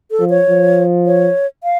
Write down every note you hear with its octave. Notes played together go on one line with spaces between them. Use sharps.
A4
F3
C#5
F3
C#5
F5